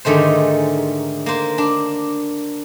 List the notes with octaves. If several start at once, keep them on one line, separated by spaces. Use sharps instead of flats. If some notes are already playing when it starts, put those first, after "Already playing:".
G#2 D3 D#3 A3 C5
A#3 C5
D4